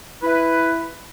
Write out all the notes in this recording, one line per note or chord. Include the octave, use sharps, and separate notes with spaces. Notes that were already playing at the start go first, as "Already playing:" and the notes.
E4 B4